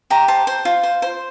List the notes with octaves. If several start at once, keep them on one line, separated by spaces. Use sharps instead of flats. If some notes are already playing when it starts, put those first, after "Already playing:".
G4 A#5
C5 A5
C5
F4
C5
C5